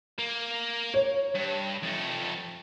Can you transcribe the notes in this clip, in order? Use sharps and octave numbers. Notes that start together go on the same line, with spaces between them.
A#3
C#5
G2
F2 A3